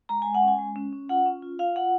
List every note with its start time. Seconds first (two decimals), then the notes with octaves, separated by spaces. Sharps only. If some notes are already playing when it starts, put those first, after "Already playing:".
0.09 G#3 A#5
0.22 G#3 G#5
0.34 F#5
0.43 C#4
0.48 G#5
0.59 G#3
0.76 C#4
0.93 C#4
1.09 F4 F#5
1.26 C#4
1.42 F4
1.59 F4 F5
1.76 F4 F#5